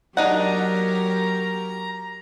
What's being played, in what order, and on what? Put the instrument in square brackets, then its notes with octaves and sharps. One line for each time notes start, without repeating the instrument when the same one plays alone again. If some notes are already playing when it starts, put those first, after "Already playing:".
[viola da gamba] F#3 G4 A#4 [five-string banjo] D4 D#4 F#5 [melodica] A#5